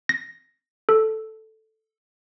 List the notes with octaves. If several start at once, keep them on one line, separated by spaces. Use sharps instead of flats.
A#6
A4